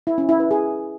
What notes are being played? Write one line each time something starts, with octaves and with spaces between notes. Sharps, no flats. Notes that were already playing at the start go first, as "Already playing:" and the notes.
E4
C#4
E4
B4
G#4